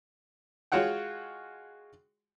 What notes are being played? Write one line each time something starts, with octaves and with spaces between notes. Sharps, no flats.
G#3 F4 F#4 C#5 F#5 G5